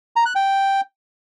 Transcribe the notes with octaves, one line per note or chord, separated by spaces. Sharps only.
A#5
F#6
G5